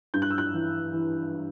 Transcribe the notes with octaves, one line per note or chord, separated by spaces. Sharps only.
G2 G6
F#6
E6
F#6
E3
E3